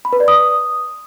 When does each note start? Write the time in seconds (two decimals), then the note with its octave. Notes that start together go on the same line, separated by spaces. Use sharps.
0.05 B5
0.13 B4
0.20 D5
0.28 D#6